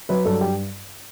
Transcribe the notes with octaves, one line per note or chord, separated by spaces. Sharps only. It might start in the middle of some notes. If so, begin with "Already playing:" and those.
F#3 B4
G2 A4
G4